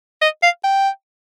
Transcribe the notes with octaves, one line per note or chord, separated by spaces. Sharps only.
D#5
F5
G5